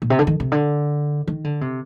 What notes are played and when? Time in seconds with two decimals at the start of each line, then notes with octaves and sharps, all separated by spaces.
0.02 A#2
0.10 C3
0.19 D3
0.27 D#3
0.40 C3
0.52 D3
1.28 D#3
1.44 D3
1.61 C3